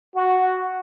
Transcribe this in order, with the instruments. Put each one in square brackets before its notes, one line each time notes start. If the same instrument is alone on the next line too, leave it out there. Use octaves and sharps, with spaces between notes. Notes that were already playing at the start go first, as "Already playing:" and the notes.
[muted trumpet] F#4